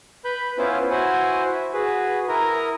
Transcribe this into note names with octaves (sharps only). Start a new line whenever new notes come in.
B4 B5 G6
B3 C#4 E4 F4 B4 C5
E4 F#4 C5 F#5 G#5
E5
F#4 G#4 B4
E4 A#4 A#5 D#6